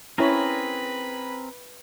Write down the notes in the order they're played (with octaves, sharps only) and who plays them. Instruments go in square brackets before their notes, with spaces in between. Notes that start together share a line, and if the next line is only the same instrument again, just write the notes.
[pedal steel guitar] C4 G#4 A#4 [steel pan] C#4 E4 C#5 [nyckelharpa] B4 B5